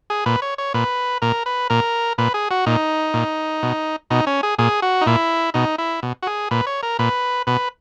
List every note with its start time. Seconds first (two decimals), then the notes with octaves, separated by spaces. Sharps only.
0.10 G#4
0.26 A#2 B4
0.42 C#5
0.58 C#5
0.74 A#2 B4
1.22 A#2 A#4
1.46 B4
1.70 A#2 A#4
2.18 A#2 B4
2.34 G#4
2.51 F#4
2.66 A#2 D#4
3.14 A#2
3.63 B2
4.10 B2 D#4
4.27 C#4
4.43 G#4
4.58 A#2 G#4
4.82 F#4
5.01 D#4
5.06 A#2 E4
5.54 B2 D#4
5.78 E4
6.03 B2
6.23 F#4
6.27 G#4
6.51 A#2 B4
6.67 C#5
6.83 A#4
6.99 A#2 B4
7.47 B2 B4